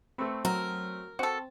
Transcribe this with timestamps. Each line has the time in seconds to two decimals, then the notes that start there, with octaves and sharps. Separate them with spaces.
0.18 A3 C4 B4 C#6
0.45 F#3 A#4
1.19 C4 F#4 A4